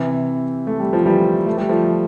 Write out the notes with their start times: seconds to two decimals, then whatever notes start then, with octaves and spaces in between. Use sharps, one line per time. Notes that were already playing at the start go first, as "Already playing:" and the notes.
Already playing: C3 E3
0.67 A3
0.80 G3
0.93 F3
1.06 E3 G3
1.46 A3
1.58 G3
1.69 F3 A3